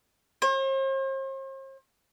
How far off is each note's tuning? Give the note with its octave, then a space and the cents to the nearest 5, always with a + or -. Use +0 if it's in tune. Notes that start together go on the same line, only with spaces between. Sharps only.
C5 +45